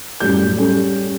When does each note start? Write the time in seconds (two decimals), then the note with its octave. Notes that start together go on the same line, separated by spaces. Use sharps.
0.20 F#2 A2 G3 G6
0.57 G3 C#4 G4 A4